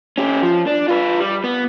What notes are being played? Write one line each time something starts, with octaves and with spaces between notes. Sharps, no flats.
C#4 G4
F3
D4
F4 B4
G3
B3